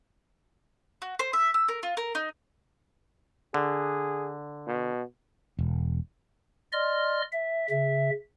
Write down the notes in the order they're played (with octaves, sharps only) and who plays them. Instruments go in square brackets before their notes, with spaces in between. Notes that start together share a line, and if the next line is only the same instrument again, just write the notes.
[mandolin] F#4
C5
E5
E6
A#4
F4
A#4
D#4
[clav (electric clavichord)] D3 [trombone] G#4
[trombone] B2
[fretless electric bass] E1
[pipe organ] D5 D#5 C6 F6
E5
C#3 E5